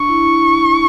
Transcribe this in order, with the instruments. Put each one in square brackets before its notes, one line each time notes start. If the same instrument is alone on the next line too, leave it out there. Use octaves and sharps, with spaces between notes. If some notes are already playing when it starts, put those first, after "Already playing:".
Already playing: [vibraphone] D4 [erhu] C#6
[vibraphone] E4
E4